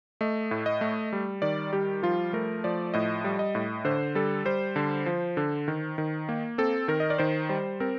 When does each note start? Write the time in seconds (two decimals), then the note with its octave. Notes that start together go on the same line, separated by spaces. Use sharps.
0.21 A3 D#5
0.51 A2
0.66 D#5
0.81 A3
1.13 G3
1.42 D#3 D5
1.73 G3 G4
2.03 F3 F4
2.33 A3 A#4
2.64 F3 D5
2.94 A2 D#5
3.24 G3
3.39 D#5
3.55 A2
3.85 D3 C5
4.15 G3 A4
4.45 G3 C5
4.76 D3
5.06 F3
5.37 D3
5.68 D#3
5.98 D#3
6.29 A#3
6.58 C4 A4
6.88 D#3 A#4
7.00 D#5
7.10 D5
7.18 D#3 C5
7.49 G3 C5
7.80 C4 A#4